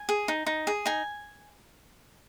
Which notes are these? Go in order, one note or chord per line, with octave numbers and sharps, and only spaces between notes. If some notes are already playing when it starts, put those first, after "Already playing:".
Already playing: G#5
G#4
D#4
D#4
G#4
D#4 G#5